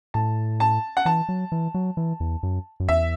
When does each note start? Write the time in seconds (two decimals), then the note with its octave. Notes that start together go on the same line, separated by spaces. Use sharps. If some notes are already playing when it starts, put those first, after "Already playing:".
0.14 A2 A5
0.60 A5
0.97 F#5
1.05 E3 A5
1.29 F#3
1.52 E3
1.74 F#3
1.97 E3
2.20 E2
2.43 F#2
2.80 F#2
2.89 E2 E5